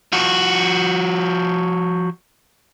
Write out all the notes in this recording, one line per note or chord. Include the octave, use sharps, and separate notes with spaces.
F3 F#4